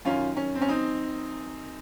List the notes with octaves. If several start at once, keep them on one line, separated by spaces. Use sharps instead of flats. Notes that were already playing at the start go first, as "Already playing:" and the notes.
F#2 D#3 C#4 F4
C#4
C4
C#4
C4 D#4